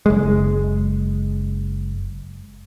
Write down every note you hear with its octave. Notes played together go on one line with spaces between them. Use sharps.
F#1 G#3